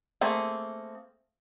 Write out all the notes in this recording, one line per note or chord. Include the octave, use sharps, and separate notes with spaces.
A3 A#3 C4 G#4